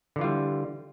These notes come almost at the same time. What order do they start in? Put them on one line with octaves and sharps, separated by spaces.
D3 E3 F4 G3